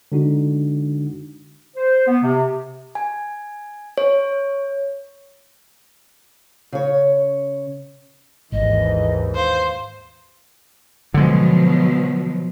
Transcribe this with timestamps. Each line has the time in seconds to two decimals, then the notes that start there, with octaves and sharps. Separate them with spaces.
0.12 D3 G#3 D4 D#4 F#4
1.76 C5
2.06 B3
2.22 C3
2.95 G#5
3.98 C#5
6.72 C#3 C#5
8.52 G#1 D#2 G#2 E3 D#5
9.35 C5 F5
11.14 B2 D3 F3 F#3 G#3